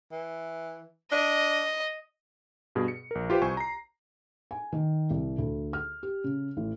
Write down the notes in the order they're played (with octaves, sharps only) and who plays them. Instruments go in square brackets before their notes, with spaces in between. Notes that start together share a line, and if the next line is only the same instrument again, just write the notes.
[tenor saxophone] E3
[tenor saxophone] D4 [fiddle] D#5
[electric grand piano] G2 B2 G#4
C#7
A#1 A#4
F4 G4 B4 C5
C2 C5 G#5 C#6
A#5 C7
[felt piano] G#5
D#3
C2
D2
F6
G4
C#3
A1